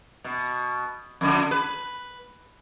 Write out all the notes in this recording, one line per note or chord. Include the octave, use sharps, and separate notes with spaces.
B2
F2 D3
B4